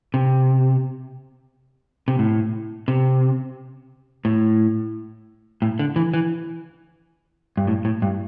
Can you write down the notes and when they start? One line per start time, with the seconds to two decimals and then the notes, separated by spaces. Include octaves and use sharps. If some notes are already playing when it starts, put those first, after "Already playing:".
0.14 C3
2.08 C3
2.19 A2
2.88 C3
4.25 A2
5.62 A2
5.79 D3
5.96 E3
6.14 E3
7.57 G2
7.67 A2
7.85 A2
8.02 G2